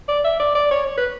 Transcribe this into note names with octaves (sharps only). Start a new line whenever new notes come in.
D5
E5
D5
D5
C#5
C#5
B4